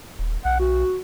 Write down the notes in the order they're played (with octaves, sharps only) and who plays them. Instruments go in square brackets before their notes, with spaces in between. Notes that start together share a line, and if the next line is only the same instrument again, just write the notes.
[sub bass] D#1
[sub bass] B1 [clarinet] F#5
[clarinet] F#4